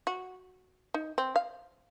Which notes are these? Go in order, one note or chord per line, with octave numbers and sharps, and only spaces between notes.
F#4
D#4
C4
F5